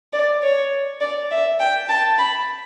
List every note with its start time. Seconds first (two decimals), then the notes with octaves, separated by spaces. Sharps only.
0.13 D5
0.43 C#5
1.01 D5
1.31 E5
1.60 G5
1.89 A5
2.18 B5